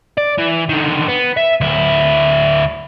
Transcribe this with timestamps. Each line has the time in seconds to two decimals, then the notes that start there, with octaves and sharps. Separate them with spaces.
0.18 D5
0.38 E3
0.69 D3 D#3
1.08 B3
1.37 E5
1.61 D2 E4